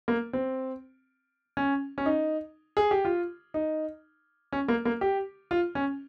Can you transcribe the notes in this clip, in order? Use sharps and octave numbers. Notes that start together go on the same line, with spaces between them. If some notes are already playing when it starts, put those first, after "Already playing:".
A#3
C4
C#4
C#4
D#4
G#4
G4
F4
D#4
C#4
A#3
A#3
G4
F4
C#4